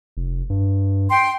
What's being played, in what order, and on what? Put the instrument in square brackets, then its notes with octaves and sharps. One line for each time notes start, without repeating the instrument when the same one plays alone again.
[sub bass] F1
G2
[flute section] G5 C6